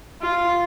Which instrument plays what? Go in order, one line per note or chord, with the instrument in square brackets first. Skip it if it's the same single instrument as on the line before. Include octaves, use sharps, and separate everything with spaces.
[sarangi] F4